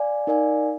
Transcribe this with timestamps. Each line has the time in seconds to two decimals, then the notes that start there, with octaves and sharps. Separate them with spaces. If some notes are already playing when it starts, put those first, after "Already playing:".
Already playing: D5 F5 G#5
0.27 D#4 A#4 D5 F5 G#5